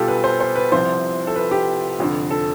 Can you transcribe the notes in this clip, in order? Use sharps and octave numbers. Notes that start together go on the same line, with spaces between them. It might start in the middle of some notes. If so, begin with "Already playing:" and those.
Already playing: B1 B2 G3 F4 G4 A4
B4
C5
C5
B4
C2 C3 F3 C5
A4
B4
G4
F1 F2 D3
A4